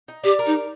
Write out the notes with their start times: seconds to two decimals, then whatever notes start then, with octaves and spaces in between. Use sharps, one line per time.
0.08 D#4
0.24 G4 D5
0.39 A#4
0.46 D#4
0.54 D5